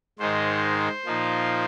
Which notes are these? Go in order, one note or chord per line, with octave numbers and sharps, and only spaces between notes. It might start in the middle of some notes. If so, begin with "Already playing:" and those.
G#2 D#3 G#3 D#4 C5
A#2 F3 A#3 D#4